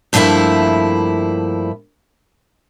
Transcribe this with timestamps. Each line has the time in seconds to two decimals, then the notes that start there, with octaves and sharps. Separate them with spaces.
0.13 G2 F3 A3 A#3 E4 E5